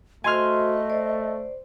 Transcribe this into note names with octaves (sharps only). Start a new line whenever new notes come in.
A3 F#4 C5 D#5 G#5 C6 F6
C5 D5